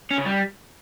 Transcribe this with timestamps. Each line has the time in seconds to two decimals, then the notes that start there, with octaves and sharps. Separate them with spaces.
0.11 C#4
0.18 C#3
0.25 G3